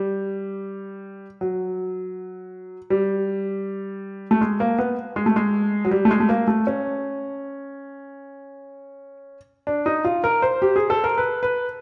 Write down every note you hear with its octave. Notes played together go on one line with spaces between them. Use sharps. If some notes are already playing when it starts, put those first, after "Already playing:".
Already playing: G3
F#3
G3
A3
G#3
A#3
B3
G#3
A3
G#3
F#3
G3
A3
G#3
A3
A#3
A3
C#4
D4
D#4
F4
A#4
C5
G4
G#4
A4
A#4
B4
B4